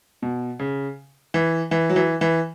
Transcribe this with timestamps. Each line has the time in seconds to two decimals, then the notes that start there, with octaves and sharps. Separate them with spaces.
0.22 B2
0.59 C#3
1.34 E3
1.71 E3
1.90 F#3
1.96 E3
2.21 E3